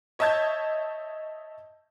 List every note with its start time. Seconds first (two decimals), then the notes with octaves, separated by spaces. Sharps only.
0.19 C#5 D#5 E5 A5 G6 G#6